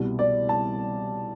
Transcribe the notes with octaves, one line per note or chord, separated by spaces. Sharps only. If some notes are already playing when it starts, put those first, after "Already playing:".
Already playing: C2 B2 G3
D5
A5